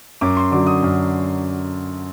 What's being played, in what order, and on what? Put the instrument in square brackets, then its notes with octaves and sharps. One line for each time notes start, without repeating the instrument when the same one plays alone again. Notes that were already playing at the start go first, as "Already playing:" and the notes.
[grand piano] F#2 D6
C6
D3 F#3 D6
D#6
F#2